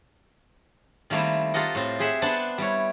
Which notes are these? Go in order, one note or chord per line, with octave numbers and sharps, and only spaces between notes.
D#3 G3 A3 A#3 C4 E4
F4 G4 A4 A#4 D#5 F#5
A2 C4
G4 G#4 C5 E5 F#5
B3 D4 C5 F#5 A5
G3 E4 C#5